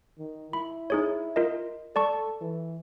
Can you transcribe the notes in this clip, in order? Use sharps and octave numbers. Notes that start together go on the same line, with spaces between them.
D#3
E4 B5
D#4 G#4 C#5
F4 A#4 D#5
A4 D5 A5 C#6
E3